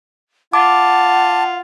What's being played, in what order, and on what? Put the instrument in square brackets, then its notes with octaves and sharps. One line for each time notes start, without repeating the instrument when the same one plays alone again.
[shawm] F4 [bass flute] F#5 [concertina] A5 [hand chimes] D6